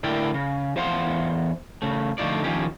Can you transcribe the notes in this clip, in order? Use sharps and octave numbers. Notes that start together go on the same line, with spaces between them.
A2 D3 E4 A#4 D5 G5
C#3
E2 C5 F5 F#5 G#5 C6
C#3 A3
D3 F3 A3 D#4 F4 D5
D#3 F3 C#4 G4